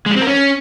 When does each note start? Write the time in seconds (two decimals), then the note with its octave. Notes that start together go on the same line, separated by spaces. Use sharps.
0.06 G#3
0.11 G3
0.16 C4
0.22 A#4
0.27 C#4